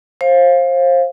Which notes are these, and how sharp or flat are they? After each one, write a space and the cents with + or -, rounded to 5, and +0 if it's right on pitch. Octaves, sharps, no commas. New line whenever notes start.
C5 +30 F5 +0